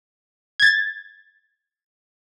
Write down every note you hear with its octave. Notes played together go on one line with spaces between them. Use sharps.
G#6 A6